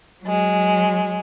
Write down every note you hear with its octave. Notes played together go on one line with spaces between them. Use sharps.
F#3 G#3